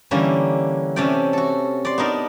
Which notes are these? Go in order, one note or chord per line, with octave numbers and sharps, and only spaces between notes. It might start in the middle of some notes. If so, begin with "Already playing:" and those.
D3 E3 G3 A#3 C#4
C3 A3 C#4 D5 G5
F#4 A4
D5 C6
B3 D4 D#4 A#4